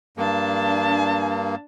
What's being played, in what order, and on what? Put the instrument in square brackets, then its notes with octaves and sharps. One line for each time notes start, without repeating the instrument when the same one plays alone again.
[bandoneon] G2 A#3 [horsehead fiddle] D4 A5